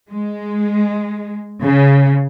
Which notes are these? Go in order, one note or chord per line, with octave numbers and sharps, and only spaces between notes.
G#3
C#3